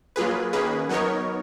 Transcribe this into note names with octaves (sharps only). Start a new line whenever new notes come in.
F#3 A#3 F4 G#4 B4
D#3 A#3 C#4 G#4 B4
F#3 B3 D#4 A#4 C#5